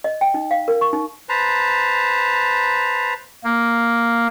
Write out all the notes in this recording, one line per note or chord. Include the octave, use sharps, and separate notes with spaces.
D#5
G5
D#4
F5
A#4
C#6
D#4
B4 C5 A5 A#5
A#3